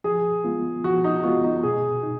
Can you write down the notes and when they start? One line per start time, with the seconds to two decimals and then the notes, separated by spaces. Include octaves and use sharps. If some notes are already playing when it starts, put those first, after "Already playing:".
0.04 F3 G#4
0.44 G#3 B3 F4
0.84 F3 F#4
1.04 D#4
1.23 G#3 B3 F4 F#4
1.44 D#4
1.63 B2 G#4
2.03 D#4